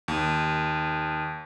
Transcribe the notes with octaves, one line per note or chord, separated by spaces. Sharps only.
D#2